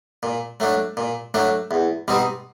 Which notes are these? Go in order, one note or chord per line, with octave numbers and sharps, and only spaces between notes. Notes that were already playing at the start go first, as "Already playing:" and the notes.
A#2
F#3 A3 D4
A#2
F#3 A3 D4
E2
B2 G3 C4 D#4